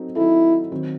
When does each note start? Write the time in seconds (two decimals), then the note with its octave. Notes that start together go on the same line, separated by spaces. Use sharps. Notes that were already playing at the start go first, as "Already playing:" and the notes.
Already playing: F#3 C4 D#4 A4
0.16 F#3 C4 D#4 E4 A4
0.72 D#3 F#3 C4